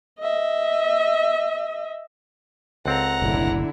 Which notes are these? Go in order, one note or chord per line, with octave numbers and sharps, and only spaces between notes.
D#5 E5
C#2 C4 A4 F#5 A#5
F#1 B1 A2 D3 E4